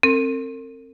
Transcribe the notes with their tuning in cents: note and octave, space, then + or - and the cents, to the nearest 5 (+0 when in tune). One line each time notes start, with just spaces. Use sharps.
C4 +25 A#4 -45